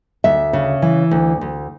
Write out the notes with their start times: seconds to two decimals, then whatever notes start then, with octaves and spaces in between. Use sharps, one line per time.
0.24 D2 E5
0.53 C#3
0.82 E3
1.11 D2
1.41 D2